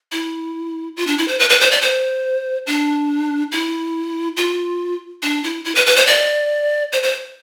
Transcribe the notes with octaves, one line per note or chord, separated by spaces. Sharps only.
E4
F4
D4
E4
C5
B4
B4
C5
D5
C5
D4
E4
F4
D4
E4
E4
B4
B4
C5
D5
C5
C5